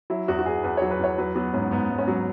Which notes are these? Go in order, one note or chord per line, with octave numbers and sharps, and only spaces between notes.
F#3 E4
E2 F#4
F#4
E2 G#4
E2 B4
F#3 C#5
B4
E2 C#5
F#3 B4
F#3 B3
G#2 C#4
G#2 B3
G#2
C#4
F#3